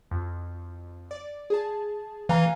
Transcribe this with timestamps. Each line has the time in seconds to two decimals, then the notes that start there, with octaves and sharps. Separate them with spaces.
0.11 F2
1.11 D5
1.50 G#4 A5
2.29 E3 F5 G#5 A#5